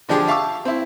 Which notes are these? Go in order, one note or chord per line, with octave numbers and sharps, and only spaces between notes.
D3 F3 D4 G4 G#4
E5 F5 A5 C#6 D6 E6
C4 E4